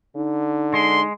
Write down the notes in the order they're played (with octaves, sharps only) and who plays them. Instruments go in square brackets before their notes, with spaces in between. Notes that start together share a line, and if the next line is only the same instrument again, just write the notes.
[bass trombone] D3 [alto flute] D#4
[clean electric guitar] G#3 [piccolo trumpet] C6